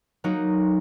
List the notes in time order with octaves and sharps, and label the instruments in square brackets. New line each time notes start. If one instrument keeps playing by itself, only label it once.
[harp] F#3 A#3 D#4 F#4